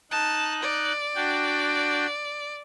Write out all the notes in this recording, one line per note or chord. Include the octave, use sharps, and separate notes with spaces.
D#4 A5 F#6
D5
D4 F#4 G5